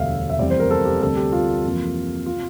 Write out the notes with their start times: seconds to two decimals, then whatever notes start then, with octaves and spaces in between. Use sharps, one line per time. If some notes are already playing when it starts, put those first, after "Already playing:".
Already playing: E1 D2 D3 G3 E5 F5
0.30 E5
0.39 F1 E2 E3 G3 C4 D5
0.50 C5
0.60 A#4
0.70 A4
0.85 G4
1.02 D2 C3 G3 C4 A4
1.16 G4
1.32 F4
1.64 F2 C3 E3 A#3
2.26 F4
2.31 C3